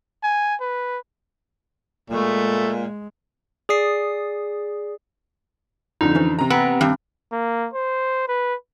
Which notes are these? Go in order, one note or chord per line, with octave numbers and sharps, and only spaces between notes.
G#5
B4
A#2 G#3 A3
G#4 D5 D#6 C7
F2 D3 D#4
E3 C#4 C5
C3 A#5
B3 C4
G2 D#3 G4 G6
A#3
C5
B4